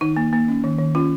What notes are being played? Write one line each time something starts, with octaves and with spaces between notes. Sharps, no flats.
D#3 D#4
A#3
A#3
C#4
D#3
D#3
C#4 F4